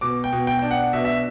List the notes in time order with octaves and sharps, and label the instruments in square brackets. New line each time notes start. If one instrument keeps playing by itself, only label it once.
[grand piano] B2 D6
G5
B2
G5
D4 G5
F#5
B2 E5
E5